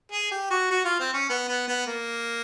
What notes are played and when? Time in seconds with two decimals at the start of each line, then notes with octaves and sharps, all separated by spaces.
0.12 G#4
0.31 G4
0.51 F#4
0.70 F#4
0.85 F4
0.99 C4
1.14 C#4
1.29 B3
1.48 B3
1.68 B3
1.87 A#3